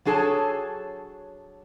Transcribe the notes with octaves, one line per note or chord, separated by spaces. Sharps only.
F#3 D4 G#4 A4 C#5 A5